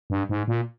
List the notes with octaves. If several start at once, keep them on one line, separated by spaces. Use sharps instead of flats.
G2
G#2
A#2